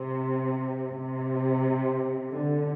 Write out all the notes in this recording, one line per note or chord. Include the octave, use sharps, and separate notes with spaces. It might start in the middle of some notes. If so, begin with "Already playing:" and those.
Already playing: C3
C3
D3